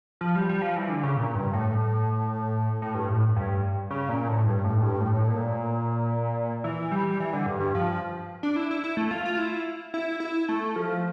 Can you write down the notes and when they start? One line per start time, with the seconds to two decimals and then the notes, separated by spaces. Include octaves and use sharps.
0.21 F3
0.35 G3
0.49 G3
0.62 F3
0.76 E3
0.90 D3
1.03 C#3
1.17 A#2
1.35 G2
1.53 A2
2.82 A2
2.95 G2
3.09 A2
3.36 G2
3.91 C#3
4.09 A#2
4.28 A2
4.46 G2
4.64 A2
4.82 G2
5.01 A2
5.28 A#2
6.64 E3
6.92 G3
7.20 E3
7.33 D3
7.46 G2
7.60 G2
7.75 F3
8.43 D4
8.56 E4
8.71 E4
8.84 E4
8.97 A3
9.11 F4
9.25 F4
9.38 E4
9.94 E4
10.20 E4
10.49 A3
10.76 F3